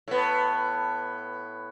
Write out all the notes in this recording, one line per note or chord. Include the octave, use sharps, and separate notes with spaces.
A2 B3